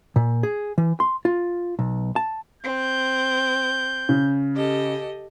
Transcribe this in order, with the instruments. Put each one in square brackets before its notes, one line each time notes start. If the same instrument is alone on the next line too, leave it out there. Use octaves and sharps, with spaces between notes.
[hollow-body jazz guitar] A#2
G#4
E3
C6
F4
B1
A5
[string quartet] C4 [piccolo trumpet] G6
[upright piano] C#3
[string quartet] G4 A4 D#5